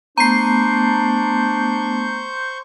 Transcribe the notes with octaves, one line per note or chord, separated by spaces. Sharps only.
A3 B3 D4 C5 A#5 C#6 G6 C7